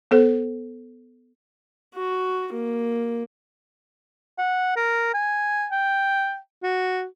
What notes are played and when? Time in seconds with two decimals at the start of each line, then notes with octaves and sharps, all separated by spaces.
0.11 B3 A4 C5
1.95 F#4
2.53 A#3
4.38 F#5
4.77 A#4
5.14 G#5
5.71 G5
6.63 F#4